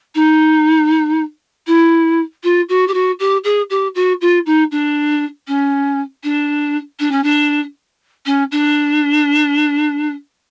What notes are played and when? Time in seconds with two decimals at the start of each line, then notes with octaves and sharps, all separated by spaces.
0.15 D#4
1.67 E4
2.44 F4
2.69 F#4
2.88 G4
2.94 F#4
3.20 G4
3.44 G#4
3.70 G4
3.95 F#4
4.21 F4
4.46 D#4
4.71 D4
5.48 C#4
6.24 D4
7.00 D4
7.11 C#4
7.24 D4
8.26 C#4
8.52 D4